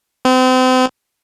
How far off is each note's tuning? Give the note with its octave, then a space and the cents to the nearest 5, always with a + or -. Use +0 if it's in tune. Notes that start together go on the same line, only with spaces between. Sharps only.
C4 -35